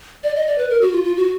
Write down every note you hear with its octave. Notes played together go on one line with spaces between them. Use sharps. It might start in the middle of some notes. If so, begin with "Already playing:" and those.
D5
D#5
D5
B4
A#4
F#4
F4
F4
F#4